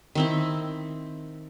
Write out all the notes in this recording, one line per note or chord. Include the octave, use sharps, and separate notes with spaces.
D#3 C4 E4